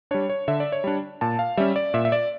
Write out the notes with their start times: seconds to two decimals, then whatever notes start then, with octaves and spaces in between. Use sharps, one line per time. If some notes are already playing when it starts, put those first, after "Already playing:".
0.11 G3 D4 C#5
0.30 C#5
0.48 D3 E5
0.60 D5
0.72 C#5
0.84 G3 D4
1.21 A#2 A5
1.39 F5
1.57 G3 C#4 E5
1.76 D5
1.94 A#2 E5
2.05 E5
2.12 D5